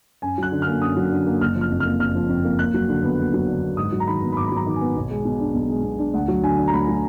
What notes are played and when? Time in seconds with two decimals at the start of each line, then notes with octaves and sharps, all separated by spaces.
0.22 F#2 G#5
0.38 F#3 F#6
0.52 D3
0.62 F6
0.67 A#3
0.82 F#2 D#6
0.97 F#3
1.12 D3
1.26 A#3
1.41 F#1 F6
1.56 F3
1.61 F6
1.71 F2
1.80 F6
1.86 A#3
2.00 F#1 F6
2.15 F3
2.29 F2
2.45 A#3
2.59 D#2 F#6
2.74 F#3
2.88 D3
3.04 B3
3.18 D#2
3.33 F#3
3.48 D3
3.63 B3
3.77 G#2 D#6
3.92 F#3
4.00 A#5
4.07 D#3 B5
4.22 B3
4.33 B5
4.37 G#2 D6
4.47 B5
4.51 F#3 A#5
4.66 D#3
4.76 G#5
4.81 B3
4.96 B1
5.10 G#3
5.25 B2
5.40 D4
5.54 B1
5.70 G#3
5.84 B2
5.99 D4
6.13 D2 F#5
6.28 F#3
6.43 D3 G#5
6.58 D4
6.67 A#5
6.73 D2 B5
6.88 F#3